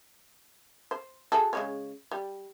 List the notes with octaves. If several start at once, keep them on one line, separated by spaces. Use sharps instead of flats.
C5
F#4 G#4 A4
C#3 G#3 C#4
G3